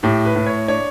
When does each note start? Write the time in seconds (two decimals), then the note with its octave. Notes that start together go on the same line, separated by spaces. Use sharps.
0.03 A2 G4
0.25 B4
0.36 A2
0.46 C#5
0.68 D4 C#5